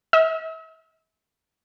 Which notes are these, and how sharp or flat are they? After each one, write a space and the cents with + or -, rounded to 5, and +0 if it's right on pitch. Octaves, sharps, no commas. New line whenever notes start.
E5 -40